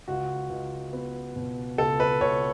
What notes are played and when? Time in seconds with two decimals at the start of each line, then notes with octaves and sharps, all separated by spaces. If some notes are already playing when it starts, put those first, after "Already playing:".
0.08 C#2 F#4
0.50 C#2
0.93 B3
1.36 B2
1.78 C#2 A4
2.00 B4
2.21 C#2 C#5